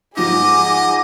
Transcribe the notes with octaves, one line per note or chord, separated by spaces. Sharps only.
G#2 F3 G#4 D#5 F#5 D6